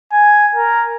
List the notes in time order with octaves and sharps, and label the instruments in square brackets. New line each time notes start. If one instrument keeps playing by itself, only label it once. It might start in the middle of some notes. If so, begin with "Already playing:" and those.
[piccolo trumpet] G#5
A#4